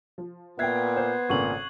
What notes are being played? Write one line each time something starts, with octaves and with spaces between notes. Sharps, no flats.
F3
A#2 B3 E5 G5 F#6 G#6 C7
C5
G#1 A#2 C#3 A4 C#6 F#7